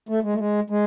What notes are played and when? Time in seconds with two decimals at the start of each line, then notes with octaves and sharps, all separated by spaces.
0.09 A3
0.23 G#3
0.34 A3
0.39 G#3
0.70 G#3